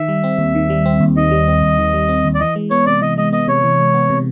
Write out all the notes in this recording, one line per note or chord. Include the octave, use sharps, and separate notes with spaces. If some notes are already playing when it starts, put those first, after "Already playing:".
Already playing: D#3 E5
G3
C4
D#2
D#3
G3
C4
D#2
D#3 D#5
G3
C4
D#2
D#3
G3
C4
D#2
D5
E3 D#5
G#3
B3 C#5
C3 D5
E3 D#5
G#3 D#5
B3 D#5
C3 C#5
E3
G#3
B3
C3